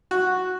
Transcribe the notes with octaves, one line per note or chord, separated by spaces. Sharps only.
F#4